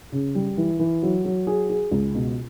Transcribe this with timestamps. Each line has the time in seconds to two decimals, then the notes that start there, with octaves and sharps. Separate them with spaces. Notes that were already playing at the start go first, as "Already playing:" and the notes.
0.12 C#3
0.35 G3
0.57 E3
0.79 E3
1.03 F#3
1.25 F#3
1.47 G#4
1.70 G#4
1.91 C#2
2.14 B2